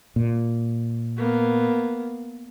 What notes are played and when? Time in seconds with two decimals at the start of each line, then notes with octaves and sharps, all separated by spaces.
0.16 A#2
1.18 A#3 B3